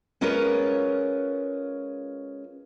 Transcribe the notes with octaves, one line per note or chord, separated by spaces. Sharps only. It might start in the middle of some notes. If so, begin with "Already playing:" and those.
G#3 C#4 F4 A#4 B4 C#5